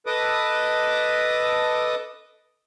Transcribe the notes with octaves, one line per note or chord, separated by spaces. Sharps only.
A4 B4 D#5 D6 D#6